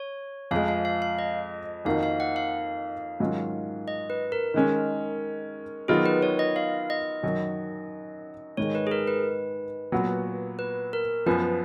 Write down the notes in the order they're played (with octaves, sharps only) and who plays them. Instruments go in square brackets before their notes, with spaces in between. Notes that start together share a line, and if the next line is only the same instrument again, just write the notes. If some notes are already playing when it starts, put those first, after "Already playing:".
Already playing: [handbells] C#5
[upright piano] F2 F3 G#3 [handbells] F5
[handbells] F5
F5
F5
D#5
[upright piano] F2 D#3 A#3 D#4 F#4 [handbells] F5
[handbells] F5
F#5
F5
[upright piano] G#2 D#3 F#3 C#4 F4
[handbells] D#5
B4
A#4
[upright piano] D#3 G#3 C#4
[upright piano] D#3 F#3 B3 F4 [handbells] G#4
[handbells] B4
C#5
D#5
F5
D#5
[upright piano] F#2 D#3 F#3
[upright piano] G#2 D#3 G#3 [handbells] C#5
[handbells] B4
G#4
A#4
B4
[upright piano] A#2 F#3 B3 F#4
[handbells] B4
A#4
[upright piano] F#2 F3 B3 [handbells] B4